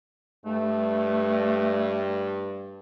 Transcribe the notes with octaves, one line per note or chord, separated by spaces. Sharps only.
G2 A3